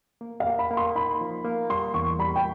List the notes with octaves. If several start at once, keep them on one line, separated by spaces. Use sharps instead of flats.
A#3
F5
A#3
B5
A#3
C6
D#4 B5
F3
A#3
G3 C6
E2 C#6
G3 B5
G5